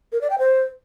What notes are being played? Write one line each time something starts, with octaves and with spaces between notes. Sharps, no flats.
A#4
D5
G5
C5